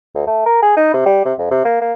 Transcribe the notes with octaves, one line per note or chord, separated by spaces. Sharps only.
D2
A3
A#4
G#4
D#4
C3
G3
C3
F2
C3
A#3
A#3